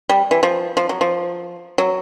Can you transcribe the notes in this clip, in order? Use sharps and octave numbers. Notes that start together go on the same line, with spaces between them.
G3
E3
F3
F3
F#3
F3
F#3